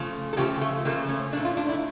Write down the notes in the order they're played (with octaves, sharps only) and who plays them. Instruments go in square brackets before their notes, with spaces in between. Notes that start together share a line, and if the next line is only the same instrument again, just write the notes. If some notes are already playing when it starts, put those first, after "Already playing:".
Already playing: [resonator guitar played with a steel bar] C#3 F3 A3
A4
C#3 F3 A3 G4
A3
C#3 F3 A3 A#3
C#4
A#2 A3 D4
F4
D4
E4